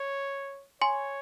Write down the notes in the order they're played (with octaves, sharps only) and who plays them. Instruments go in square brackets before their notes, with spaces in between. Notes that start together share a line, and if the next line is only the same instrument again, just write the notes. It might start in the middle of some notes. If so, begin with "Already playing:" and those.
Already playing: [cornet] C#5
[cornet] C#5 [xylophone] G#5 C6